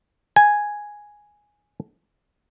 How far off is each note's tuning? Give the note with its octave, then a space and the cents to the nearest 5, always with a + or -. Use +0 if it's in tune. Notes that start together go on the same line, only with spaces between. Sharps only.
G#5 +0